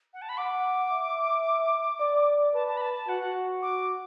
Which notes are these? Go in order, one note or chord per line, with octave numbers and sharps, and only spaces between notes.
F#5
A5
B5
F#5 D6
E5
D5
B4 A5
A5
B5
A5
A5
F#4 F#5
D6